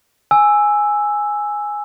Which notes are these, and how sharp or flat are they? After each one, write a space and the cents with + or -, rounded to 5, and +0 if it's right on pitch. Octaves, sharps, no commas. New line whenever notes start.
G#5 +0 E6 +0